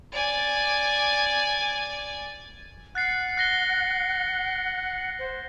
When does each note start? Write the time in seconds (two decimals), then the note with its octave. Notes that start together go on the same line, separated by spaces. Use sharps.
0.13 D5 G#5
2.95 F#5 F#6 A6 C7
3.37 F#6 A#6 G7
5.19 C5